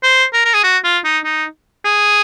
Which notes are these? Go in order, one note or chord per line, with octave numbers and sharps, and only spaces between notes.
C5
A#4
A#4
G#4
F#4
F4
D#4
D#4
G#4